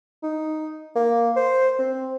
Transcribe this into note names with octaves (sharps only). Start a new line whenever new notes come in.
D#4
A#3
C5
C4